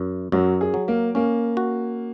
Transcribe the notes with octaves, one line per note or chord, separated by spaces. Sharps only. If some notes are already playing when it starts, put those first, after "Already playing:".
Already playing: F#2
F#2 F#3
G#4
F#3
A#3
A#3 C#4
F#4